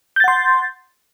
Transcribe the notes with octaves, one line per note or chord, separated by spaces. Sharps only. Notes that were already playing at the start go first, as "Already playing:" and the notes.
F#5 C6 G6 A6